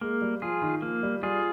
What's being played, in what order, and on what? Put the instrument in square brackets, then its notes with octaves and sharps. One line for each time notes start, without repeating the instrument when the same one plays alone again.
[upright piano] G#3 [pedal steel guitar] A#3
[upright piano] G3
[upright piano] F3 [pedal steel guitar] F4 G#4
[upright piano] D#3
[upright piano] F3 [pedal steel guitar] A#3
[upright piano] G3
[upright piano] G3 [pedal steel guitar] F4 G#4